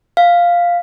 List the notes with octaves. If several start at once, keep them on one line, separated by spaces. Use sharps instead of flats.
F5